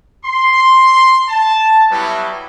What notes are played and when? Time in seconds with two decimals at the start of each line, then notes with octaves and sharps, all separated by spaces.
0.25 C6
1.28 A5
1.91 F#3 G3 B3 E4